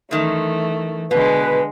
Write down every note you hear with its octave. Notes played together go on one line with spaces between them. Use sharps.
F#2 D#3 E3 A3
B2 D3 G#3 B4